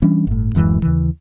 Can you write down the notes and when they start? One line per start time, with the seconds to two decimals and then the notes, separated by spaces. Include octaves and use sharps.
0.02 E3 G3 C#4 D4
0.27 G1 A2
0.55 D1 F#2 E3 G#3
0.82 D#2 C#3 E3